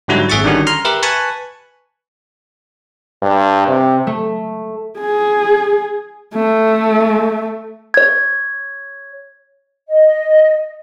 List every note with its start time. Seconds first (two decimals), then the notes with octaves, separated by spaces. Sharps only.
0.08 G#2 D3 F#3 G3 E4 F#4
0.29 G#1 G#4 E5 F#5 C#6 A6
0.44 D3 D#3 G3 C#4 F#4
0.67 A#5 C6 F6
0.85 G4 A#4 B4 E5
1.03 B4 G#5 A5 B5 C#6
3.22 G2
3.68 C3
4.07 A3
4.99 G#4
6.34 A3
7.94 C#5 G#6
9.89 D#5